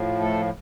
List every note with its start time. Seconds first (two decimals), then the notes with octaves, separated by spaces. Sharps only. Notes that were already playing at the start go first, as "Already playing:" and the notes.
Already playing: A2 F3
0.19 A3 A4